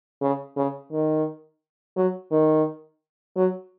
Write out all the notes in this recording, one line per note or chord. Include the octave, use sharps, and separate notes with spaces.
C#3
C#3
D#3
F#3
D#3
F#3